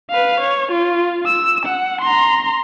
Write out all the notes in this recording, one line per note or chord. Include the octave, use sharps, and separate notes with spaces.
B4 F5
C#5
F4
E6
F#5
A#5 C6